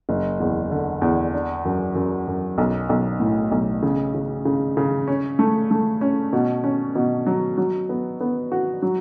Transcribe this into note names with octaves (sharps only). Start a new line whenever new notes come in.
F#1
E2
D3
E2
D4
F#2
F#2
F#2
B1
B1
A2
B1
C#3
C#3
C#3
C#3
C#4
A3
A3
C#4
B2
C#4
B2
F#3
F#3
B3
B3
F#4
F#3